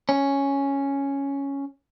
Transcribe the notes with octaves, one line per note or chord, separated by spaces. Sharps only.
C#4